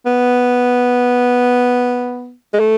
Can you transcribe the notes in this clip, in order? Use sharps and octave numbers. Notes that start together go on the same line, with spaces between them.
B3
G#3
A3